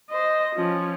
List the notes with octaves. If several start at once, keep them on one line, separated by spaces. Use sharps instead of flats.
C5 D#5
F3 C#4